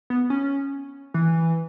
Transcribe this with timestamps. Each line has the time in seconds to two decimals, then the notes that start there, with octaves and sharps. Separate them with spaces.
0.10 B3
0.30 C#4
1.14 E3